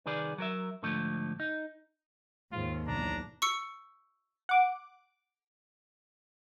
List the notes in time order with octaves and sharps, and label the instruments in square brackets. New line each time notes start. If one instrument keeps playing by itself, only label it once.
[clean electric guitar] C2 D#3 G#4 B4 D5
F#3 A#4 E5
G#2 D3 F3 A3
D#4
[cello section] D#2 [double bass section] G#2 [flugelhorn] F4
[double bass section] B1 E3 [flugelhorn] D4 [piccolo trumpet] A#5
[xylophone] C#6 E6 C#7
[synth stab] F#5 D6